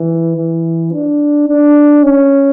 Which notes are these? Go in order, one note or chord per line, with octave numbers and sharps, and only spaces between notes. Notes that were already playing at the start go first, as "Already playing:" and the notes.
Already playing: E3
E3
D4
D4
C#4